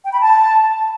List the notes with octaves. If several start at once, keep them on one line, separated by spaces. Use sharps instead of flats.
G5
B5
A5